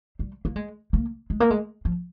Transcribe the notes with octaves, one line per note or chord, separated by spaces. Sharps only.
G3
A#3
G#3
A#3
G#3
A#3
G#3
F3